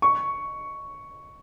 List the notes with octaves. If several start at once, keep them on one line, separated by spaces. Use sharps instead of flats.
C#6